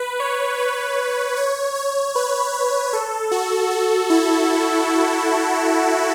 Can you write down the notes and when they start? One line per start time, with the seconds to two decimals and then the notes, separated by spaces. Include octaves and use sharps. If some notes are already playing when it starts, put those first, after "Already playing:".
Already playing: B4
0.20 C#5
0.59 B4
1.36 C#5
1.75 C#5
2.15 B4
2.53 B4
2.93 A4
3.31 F#4
3.71 F#4
4.10 E4